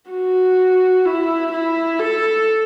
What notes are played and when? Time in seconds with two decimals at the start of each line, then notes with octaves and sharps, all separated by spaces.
0.11 F#4
1.05 E4
1.52 E4
1.99 A4